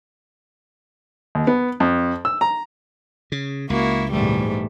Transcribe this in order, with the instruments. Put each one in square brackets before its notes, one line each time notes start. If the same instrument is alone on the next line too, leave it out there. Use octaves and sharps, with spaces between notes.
[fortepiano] D#2
B3
F2
E6
A#5
[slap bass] C#3
[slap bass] C#2 [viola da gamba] A#3 E4 F#4
[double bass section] A#1 G#2 [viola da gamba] E2 G3 A3